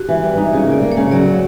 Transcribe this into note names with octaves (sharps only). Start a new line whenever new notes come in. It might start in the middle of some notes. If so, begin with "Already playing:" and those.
Already playing: F#4 G4
E3
G3
D#4
C#3 C#5
A#3 D5
A#3
C#5
C#3
F#3 D5